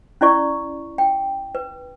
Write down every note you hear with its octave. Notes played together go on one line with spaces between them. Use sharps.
C#4 E4 D5 C#6
G5
B4